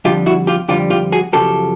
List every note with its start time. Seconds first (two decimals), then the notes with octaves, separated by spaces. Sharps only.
0.05 F2 D3 G3 F4 G4
0.26 E4 F#4
0.47 F4 G4
0.68 F2 D3 G3 F4 G4
0.90 F4 G4
1.12 F#4 G#4
1.33 F#2 C#3 F3 G4 A4